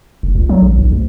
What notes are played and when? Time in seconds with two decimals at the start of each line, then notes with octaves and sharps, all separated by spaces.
0.23 F1
0.35 C#2
0.49 F#3
0.62 A1
0.78 B1
0.92 D2